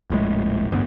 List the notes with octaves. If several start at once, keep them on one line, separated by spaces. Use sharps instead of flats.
D#1 A#1 A2 G#3
A1 D2 G2 B3